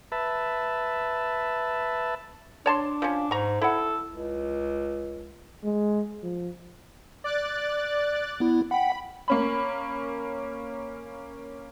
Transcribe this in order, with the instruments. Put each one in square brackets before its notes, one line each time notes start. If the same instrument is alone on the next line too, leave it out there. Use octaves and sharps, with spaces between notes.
[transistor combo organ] B4 E5 A5
[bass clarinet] D4 [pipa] C#5 A5 C6
[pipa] F3 C#4
[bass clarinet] G#2 [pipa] A#5 C#6
[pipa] E4 F#5 [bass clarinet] A4
[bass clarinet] C#2
[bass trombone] G#3
F3
[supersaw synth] D5 F#6 A6
[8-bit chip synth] B3 E4
[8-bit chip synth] F#5 G5 [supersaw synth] B5
[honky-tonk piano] A#3 C#4 B5